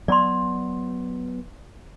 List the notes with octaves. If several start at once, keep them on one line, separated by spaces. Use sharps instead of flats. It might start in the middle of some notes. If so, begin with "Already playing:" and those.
F#3 B3 D5 C6